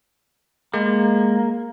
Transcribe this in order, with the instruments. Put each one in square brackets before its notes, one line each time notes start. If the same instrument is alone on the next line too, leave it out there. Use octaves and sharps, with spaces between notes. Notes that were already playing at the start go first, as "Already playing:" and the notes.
[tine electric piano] G#3 [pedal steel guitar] A#3